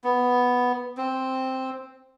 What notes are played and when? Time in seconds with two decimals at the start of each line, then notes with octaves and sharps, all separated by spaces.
0.04 B3
0.97 C4